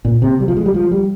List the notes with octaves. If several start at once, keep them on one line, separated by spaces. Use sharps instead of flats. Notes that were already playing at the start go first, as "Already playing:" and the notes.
A#2
C3
G3
F3
G#3
G3
F3
G3